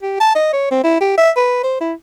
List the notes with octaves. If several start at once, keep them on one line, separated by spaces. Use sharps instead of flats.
G4
A5
D#5
C#5
C4
E4
G4
E5
B4
C5
E4